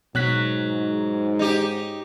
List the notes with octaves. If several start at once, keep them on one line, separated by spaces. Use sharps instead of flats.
G#2 B2 F#3 F#6 B6
D#4 G4